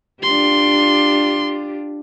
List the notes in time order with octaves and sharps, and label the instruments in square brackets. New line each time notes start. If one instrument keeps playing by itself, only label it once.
[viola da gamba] D4 F4 G4 [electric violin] C6